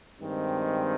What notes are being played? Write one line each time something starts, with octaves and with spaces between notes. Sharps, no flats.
G2 D#3 G#3 C4